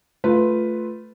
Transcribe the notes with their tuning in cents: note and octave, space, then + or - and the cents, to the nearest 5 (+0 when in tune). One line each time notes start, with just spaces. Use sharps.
A3 +0 F4 +0 B4 +0